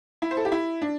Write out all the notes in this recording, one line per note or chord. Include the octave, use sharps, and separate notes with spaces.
E4
C5
A4
G4
E4
D4